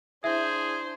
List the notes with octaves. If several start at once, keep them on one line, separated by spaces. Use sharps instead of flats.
D4 E4 G#4 C5 E5